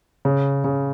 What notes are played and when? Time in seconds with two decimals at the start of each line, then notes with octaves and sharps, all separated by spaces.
0.25 C#3
0.64 C#3